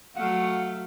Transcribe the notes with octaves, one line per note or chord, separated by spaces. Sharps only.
F#3 A3 F5 F#5